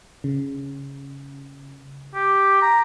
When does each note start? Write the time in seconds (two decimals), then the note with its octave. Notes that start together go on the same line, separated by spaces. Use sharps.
0.24 C#3
2.14 G4
2.62 A#5